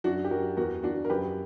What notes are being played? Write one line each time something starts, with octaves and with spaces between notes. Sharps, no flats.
F#2 D4 F#4
G4
F#2 F#4 A#4
E2 F#4 A#4
E2 D4 F#4
A#4
F#2 G4 B4